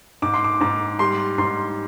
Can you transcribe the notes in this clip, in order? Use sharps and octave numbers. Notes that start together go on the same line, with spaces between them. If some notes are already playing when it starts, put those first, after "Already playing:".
G#2 D6
C6
D6
G#2 D6
G3 C6
G#2 C6